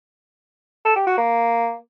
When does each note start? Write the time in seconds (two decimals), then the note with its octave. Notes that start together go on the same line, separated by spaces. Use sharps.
0.85 A4
0.96 G4
1.07 F#4
1.18 A#3